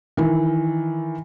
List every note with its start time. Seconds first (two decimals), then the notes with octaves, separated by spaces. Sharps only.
0.17 D#3 E3